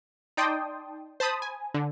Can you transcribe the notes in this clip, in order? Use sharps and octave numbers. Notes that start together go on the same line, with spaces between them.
D#4 D5 G5 A5 C6 D#6
C5 A5 B5 D#6
G#5
D3